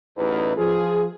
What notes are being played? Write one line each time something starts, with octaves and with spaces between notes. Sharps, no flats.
A1 E2 D#4 B4
F3 F4 G#4